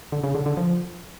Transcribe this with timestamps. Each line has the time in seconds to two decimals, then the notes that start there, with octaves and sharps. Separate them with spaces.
0.12 D3
0.24 C#3
0.35 D3
0.46 D3
0.57 F3